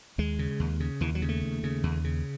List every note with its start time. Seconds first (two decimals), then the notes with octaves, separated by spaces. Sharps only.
0.18 D#2 G#3
0.39 C#3
0.60 D#2
0.80 C#3
1.01 D#2 E3
1.15 F#3
1.22 C#3
1.29 A3
1.43 D#2
1.64 C#3
1.83 D#2
2.04 C#3